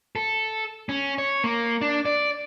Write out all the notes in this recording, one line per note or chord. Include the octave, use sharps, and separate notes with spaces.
A4
C#4
C#5
A#3
D4
D5